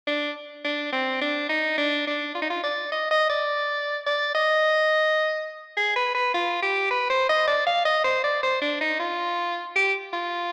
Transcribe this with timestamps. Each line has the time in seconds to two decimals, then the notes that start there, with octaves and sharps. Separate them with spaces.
0.07 D4
0.64 D4
0.93 C4
1.22 D4
1.49 D#4
1.78 D4
2.07 D4
2.35 F4
2.42 D#4
2.50 F4
2.63 D5
2.92 D#5
3.11 D#5
3.30 D5
4.06 D5
4.35 D#5
5.77 G#4
5.96 B4
6.15 B4
6.34 F4
6.62 G4
6.91 B4
7.10 C5
7.29 D#5
7.48 D5
7.67 F5
7.85 D#5
8.05 C5
8.24 D5
8.43 C5
8.61 D4
8.81 D#4
8.99 F4
9.76 G4
10.13 F4